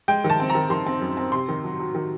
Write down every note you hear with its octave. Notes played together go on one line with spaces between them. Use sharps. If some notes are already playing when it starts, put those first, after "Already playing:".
G#3 G5
D#3
A5
C4
A#5
D#3
D#3 C6
C4
F#2
C4
C3 C6
D#3
F#3
F#3
D#3